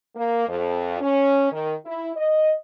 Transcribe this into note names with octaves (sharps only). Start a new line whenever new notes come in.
A#3
F2
C#4
D#3
E4
D#5